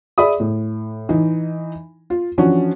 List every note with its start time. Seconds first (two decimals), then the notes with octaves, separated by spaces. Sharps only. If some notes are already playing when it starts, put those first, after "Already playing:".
0.18 G#4 D5 E5 B5 D#6
0.40 A2
1.09 E3 D#4
2.10 F4
2.38 E3 F3 C#4 D4 F#4